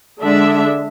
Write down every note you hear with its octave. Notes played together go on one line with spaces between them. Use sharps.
D3 G#3 D4 E5